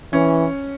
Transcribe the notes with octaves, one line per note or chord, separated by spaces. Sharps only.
E3 C#4